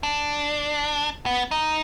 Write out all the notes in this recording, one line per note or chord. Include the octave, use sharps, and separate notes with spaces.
D4
B3
D#4